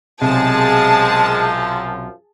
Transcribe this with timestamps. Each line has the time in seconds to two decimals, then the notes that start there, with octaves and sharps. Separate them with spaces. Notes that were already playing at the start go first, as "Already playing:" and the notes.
0.22 B1 F#2 C3 F3 G#3 G#4 A5